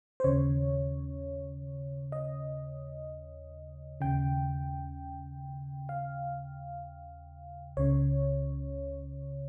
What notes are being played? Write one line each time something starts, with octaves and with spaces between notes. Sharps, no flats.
C5
D#2 C#3 C#5
D#5
D#2 C#3 G5
F5
C#2 C#3 C#5